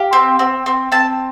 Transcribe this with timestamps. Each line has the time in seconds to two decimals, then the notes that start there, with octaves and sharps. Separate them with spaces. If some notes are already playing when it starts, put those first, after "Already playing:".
Already playing: G4 F5
0.13 C4
0.39 C4
0.66 C4
0.92 C4 A5